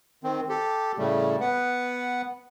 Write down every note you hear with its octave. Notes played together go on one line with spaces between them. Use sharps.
D#3 C4
G4 A4
A2 C#3 G3 A3
B3 B4 F#5